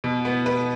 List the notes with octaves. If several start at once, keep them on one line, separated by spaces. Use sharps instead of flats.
B2
B3
B4